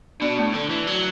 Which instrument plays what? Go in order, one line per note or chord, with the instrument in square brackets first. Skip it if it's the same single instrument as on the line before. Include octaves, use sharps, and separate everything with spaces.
[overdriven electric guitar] B2 [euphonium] D4
[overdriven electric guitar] A2
D3
E3
F#3